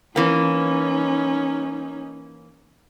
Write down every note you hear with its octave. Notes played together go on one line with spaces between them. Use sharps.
E3 A#3 C#4 D#4